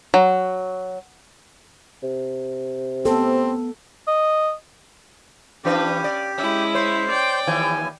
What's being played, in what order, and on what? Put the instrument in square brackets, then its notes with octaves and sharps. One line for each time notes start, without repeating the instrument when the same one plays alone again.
[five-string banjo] F#3
[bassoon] C3
[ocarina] B3 [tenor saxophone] C4 [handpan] A4
[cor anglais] D#5
[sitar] E3 D4 B4 [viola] C#4 [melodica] G4
[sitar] D5
[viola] G#3 E4 [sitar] C#4
[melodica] C5 [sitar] C#5
[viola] D5 G5
[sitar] D#2 E3 F3 [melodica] G#5